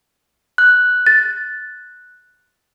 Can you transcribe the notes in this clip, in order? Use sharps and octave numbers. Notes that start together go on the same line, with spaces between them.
F#6
A6